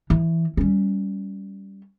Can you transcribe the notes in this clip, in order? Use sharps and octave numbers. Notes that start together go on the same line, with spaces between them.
E3
G3 C#4